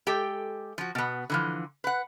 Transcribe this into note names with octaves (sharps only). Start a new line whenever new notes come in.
G#3 G4 A4 G5
F3 F#4
B2 B3
D3 E3 F3
B4 F#5